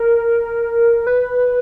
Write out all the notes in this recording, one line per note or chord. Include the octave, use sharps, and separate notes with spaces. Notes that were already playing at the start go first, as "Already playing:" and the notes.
Already playing: A#4
B4